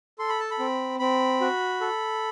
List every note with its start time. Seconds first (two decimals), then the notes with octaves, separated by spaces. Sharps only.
0.19 A4 C6
0.29 B5
0.40 A5
0.51 B5
0.59 C4
0.99 C4 B5
1.41 F#4
1.81 A4